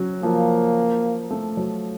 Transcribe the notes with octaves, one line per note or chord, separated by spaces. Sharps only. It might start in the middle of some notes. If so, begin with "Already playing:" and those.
Already playing: F#3 C#4
F3 A#3
A3
F#3